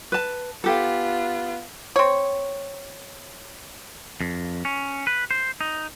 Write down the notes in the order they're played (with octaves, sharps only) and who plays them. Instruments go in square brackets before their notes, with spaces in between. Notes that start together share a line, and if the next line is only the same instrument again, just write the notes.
[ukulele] B4 A5
[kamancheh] B3 F4 [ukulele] G4 A4
[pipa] C4 C#5
[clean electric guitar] F2
C#4
B4
C5
D#4